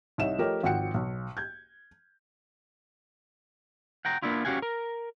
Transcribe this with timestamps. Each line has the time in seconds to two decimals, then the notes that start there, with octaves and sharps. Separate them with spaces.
0.18 C2 D#4 C#5 E5 E7
0.39 F3 A3 G4 A#4 C#5 D#5
0.63 G#1 F3 F#3 F#5 G5 C#7
0.94 B1
1.37 G6 G#6
4.05 F#5 G5 A#5
4.22 A#3 B3 D4 E4 F4
4.45 C#4 F#4 G4 F5 F#5 G#5
4.62 A#4